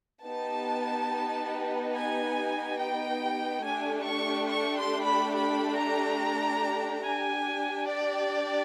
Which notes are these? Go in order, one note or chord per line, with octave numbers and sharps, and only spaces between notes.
B3 D#4 G4 A5
G#5
G5
A3 D4 G4 G#5
C#6
C#6
C6
B5
B5
A#5
D4 G4 G#5
D5